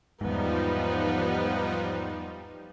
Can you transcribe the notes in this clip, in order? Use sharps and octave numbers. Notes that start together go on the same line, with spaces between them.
E2 G#2 F3 G3 B3 D#4